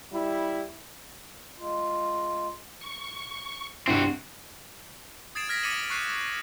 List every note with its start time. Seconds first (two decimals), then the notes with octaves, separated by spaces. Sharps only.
0.13 G3 E4
1.58 G#3 F4
2.81 C#6
3.87 C2 G2 C4 E4 F#4
5.35 D#6 G#6 A6 C7 D7 E7
5.49 F6 G#6 A#6 B6 D7
5.63 D6 A6 B6 C#7 D#7 F#7
5.90 C#6 F#6 C7 D#7